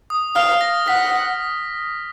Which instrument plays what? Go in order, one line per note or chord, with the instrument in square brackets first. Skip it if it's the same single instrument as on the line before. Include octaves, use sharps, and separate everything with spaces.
[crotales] D#6
[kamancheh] F5 [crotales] F6
[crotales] A#6
[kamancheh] F#5 [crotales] B6